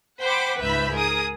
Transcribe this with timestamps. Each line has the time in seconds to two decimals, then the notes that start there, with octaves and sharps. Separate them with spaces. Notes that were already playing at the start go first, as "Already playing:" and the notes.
0.22 C5 F#5 G5 B5 D6
0.61 C#2 G#2 B4 E5 B5 G6
0.95 G#4 A#4 D#6